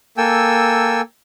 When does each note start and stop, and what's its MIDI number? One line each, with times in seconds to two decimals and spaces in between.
0.17 1.01 58
0.17 1.01 69
0.17 1.01 79
0.17 1.01 80
0.17 1.01 88